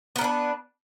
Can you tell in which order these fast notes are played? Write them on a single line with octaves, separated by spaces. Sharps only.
B3 A#4 D4 B4